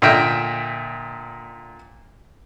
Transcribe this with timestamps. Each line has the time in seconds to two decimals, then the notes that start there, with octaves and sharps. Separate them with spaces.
0.02 A#2 D3 D#5 E5 G5